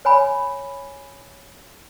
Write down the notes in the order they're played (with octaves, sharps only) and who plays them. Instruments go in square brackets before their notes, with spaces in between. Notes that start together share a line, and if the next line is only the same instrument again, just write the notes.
[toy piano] C#5 G#5 B5